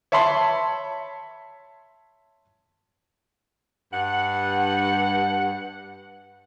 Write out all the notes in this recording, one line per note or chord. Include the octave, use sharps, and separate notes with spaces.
C#5 E5 A5 B5 C6
G2 F#5